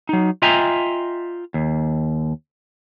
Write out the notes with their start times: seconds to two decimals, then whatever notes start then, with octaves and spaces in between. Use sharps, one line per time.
0.09 F#3 D#4
0.42 F4 D#5 E5 G5 G#5 A#5
1.54 D#2